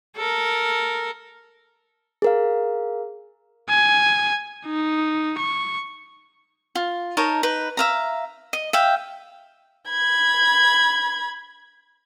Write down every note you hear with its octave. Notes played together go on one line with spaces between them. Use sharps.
A4 A#4
G#4 A#4 F5
G#5
D#4
C#6
F4
D#4 A#4 C#5 A5
D#4 B4
E5 F5 A#5
D#5
E5 F5 G5
B5 G#6